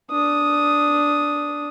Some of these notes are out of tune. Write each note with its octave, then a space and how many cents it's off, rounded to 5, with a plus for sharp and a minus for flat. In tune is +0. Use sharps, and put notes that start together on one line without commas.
D4 -10 D#6 +0